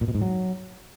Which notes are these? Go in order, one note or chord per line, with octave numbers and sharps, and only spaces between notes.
A#2
B2
G#2
F#3